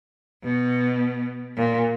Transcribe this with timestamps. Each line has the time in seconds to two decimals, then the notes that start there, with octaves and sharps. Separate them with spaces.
0.43 B2
1.56 A#2